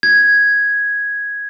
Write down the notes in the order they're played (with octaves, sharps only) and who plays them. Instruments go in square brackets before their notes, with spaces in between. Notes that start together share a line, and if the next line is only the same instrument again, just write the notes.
[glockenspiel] G#6